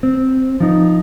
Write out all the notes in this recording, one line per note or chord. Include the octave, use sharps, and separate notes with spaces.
C4
F3 D#4